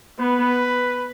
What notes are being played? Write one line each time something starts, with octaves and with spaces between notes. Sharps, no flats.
B3 B4